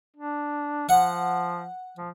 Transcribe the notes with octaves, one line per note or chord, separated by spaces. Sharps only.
D4
F3 F#5
F3